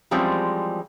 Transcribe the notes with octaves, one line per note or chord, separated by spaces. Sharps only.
E3 F3 G3 G#3 C4 C#4